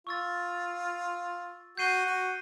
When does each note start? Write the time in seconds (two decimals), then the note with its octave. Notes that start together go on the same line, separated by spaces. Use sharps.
0.07 F4 C#6 E6 A6
1.78 F#4 G6 C7 D#7 G7
2.05 F#4